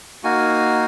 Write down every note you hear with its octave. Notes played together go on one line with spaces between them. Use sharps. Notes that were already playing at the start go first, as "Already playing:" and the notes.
A#3 D#4 F#4 F5 G#5